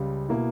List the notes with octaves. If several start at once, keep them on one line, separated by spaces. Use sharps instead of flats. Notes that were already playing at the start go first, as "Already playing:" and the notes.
Already playing: C#2 C#3 G3
B2 A#3 E4